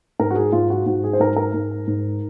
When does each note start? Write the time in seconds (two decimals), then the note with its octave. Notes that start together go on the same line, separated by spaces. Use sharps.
0.19 G#2 A#4
0.31 F#4
0.36 G#4
0.52 G#2 F4
0.70 F#4
0.86 G#2 F#4
1.04 G#4
1.13 C5
1.20 G#2 A#4
1.36 A#4
1.54 G#2
1.88 G#2